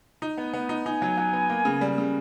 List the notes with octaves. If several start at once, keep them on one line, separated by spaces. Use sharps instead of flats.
D#4
B3
B3
D#4
D#4 G#5
F#3
F#3
B3
A#3
C#3
G3
C#3